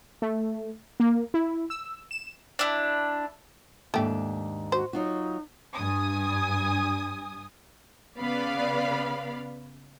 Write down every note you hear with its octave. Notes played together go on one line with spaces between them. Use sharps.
A3
A#3
E4
E6
E7
D4 E4
D#2 G#2 A3 D4 G4
F#4 C5
F#3 D#4 F4 F#4
G2 G#5 D#6
C#3 B3 D5 F5 B5